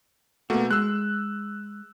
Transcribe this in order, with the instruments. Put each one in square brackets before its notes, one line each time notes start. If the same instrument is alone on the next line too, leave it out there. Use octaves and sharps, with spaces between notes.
[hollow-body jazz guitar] B2 F#4 [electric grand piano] A3 A#3
[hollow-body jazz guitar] G#3 [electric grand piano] E6 F#6